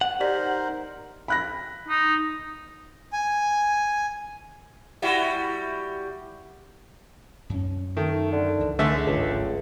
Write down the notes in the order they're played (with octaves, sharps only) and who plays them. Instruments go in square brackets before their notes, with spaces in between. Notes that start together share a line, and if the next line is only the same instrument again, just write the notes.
[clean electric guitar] F#5
[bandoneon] D#4 A#4 C5 [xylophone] G4 D5 B6
[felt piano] B5 F#6 A#6
[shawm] D#4
[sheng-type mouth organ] G#5
[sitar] G3 E4 F#4
[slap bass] F#2 C#4
[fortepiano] D#3 [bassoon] A3
[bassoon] D3
[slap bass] C#2 E3
[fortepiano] D3 A3 E5 [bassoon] G#3
[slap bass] D1 G#1 [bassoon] C#2